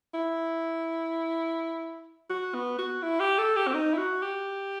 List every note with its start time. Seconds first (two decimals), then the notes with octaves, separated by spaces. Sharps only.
0.14 E4
2.30 F#4
2.54 B3
2.78 F#4
3.02 E4
3.20 G4
3.38 A4
3.56 G4
3.67 C4
3.74 D#4
3.93 E4
3.97 F#4
4.22 G4